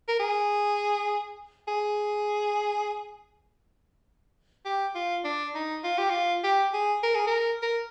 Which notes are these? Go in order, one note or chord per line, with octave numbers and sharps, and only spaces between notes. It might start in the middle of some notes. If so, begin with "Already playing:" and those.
A#4
G#4
G#4
G4
F4
D4
D#4
F4
G4
F4
G4
G#4
A#4
G#4
A#4
A#4